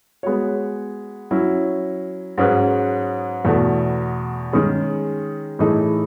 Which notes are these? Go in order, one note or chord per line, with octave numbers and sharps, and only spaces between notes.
G#3 B3 F#4 C#5
F#3 C#4 E4
G#2 F#3 C#4 G#4 B4
E2 B2 A3
D#3 G#3 C#4 G#4
A2 E3 A3 D#4 G#4